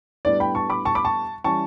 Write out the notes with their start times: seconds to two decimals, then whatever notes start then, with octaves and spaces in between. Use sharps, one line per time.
0.25 A2 G3 B3 D4 D5
0.40 G5 B5
0.55 A5 C#6
0.70 B5 D6
0.85 A5 C#6
0.95 B5 D6
1.05 A5 C#6
1.44 E3 G3 C#4 A5 C#6